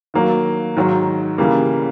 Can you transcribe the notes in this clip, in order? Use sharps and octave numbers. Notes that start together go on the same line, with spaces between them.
D#3 F#3 A#3
G#2 D#3 F#3
C#3 E3 G3 A#3